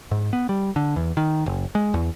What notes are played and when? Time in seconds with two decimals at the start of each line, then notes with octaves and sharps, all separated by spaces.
0.11 G#2
0.33 B3
0.49 G3
0.76 D3
0.96 E2
1.17 D#3
1.46 F#1
1.75 G#3
1.94 E2